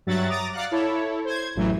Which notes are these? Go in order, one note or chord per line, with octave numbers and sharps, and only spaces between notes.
G2 F#3 F#4 E5 F#5 A6
A#5 D6 D#6 A6
D5 F5 F#5 F#6
E4 A4 C#5
C5 G#6
A1 F#2 A2 E3 F#3